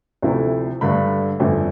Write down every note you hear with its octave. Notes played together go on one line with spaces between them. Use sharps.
D2 C3 F3 A3 E4
G2 D3 A3 B5
G1 F2 D3 A3